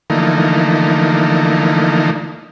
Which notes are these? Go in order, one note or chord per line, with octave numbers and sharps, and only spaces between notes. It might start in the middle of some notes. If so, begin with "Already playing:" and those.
D3 E3 F3 A3 A#3 D#4